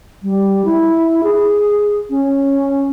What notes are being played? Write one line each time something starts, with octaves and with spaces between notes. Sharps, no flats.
G3
E4
G#4
C#4